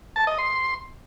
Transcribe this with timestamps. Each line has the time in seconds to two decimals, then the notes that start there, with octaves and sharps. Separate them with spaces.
0.16 A5
0.27 D#5
0.38 C6